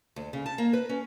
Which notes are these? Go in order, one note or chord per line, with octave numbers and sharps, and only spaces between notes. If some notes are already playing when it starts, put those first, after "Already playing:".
D2
C#3
A5
A#3
B4
C#4